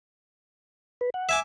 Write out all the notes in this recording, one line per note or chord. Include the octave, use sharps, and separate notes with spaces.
B4
F#5
E5 G#5 D6